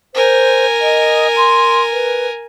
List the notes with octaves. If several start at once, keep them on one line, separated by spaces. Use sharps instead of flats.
A#4 C5 G#5
D#5
C6
B4